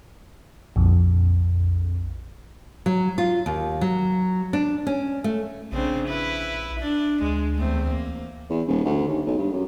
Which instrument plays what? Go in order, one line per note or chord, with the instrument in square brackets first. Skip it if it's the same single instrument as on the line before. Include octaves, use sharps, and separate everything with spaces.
[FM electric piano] A#1 F2
[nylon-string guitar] F#3
F4
D#2
F#3
D4
C#4
A3
[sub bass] A#1 [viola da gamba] C#3 C4 D4
[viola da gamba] E4 B4
D4
[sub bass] D2 [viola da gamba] G#3
[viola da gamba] E2 A3 C4
A#3
[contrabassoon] E2
D#1
D2
D#2
B1
G2
F#2